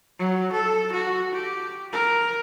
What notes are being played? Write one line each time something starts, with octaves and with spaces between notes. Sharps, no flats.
F#3
A4
F#4
G4
A#4